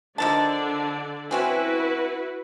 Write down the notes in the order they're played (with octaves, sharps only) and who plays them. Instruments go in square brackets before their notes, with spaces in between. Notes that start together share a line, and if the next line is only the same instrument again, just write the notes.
[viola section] D3 D4 D5 [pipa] D#3 F3 A5
[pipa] E3 C4 C#4 [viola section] E4 F#4 B4